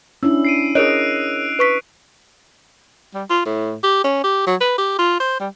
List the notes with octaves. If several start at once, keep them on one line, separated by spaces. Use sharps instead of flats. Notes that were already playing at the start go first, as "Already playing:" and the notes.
C#4 D4 E4 E6
C7 D7 D#7
G#4 A#4 C#5 D#5 F#6 D7 F7
B4 C#6 B6
G3
F4
A2
G4
C#4
G4
F#3
B4
G4
F4
C5
G3